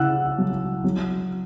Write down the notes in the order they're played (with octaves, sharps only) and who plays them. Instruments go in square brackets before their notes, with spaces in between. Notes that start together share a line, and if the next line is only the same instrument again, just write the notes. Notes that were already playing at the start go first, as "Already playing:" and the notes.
Already playing: [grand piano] C#3 E4 F#5 E6 F#6
F#3
F#3